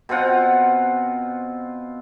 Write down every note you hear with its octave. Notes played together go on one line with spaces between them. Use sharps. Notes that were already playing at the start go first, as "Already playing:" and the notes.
B2 C4 F4 F#5